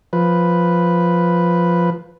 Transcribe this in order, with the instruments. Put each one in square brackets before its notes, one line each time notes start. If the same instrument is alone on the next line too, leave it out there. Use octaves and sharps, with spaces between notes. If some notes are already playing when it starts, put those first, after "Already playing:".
[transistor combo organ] F3 B4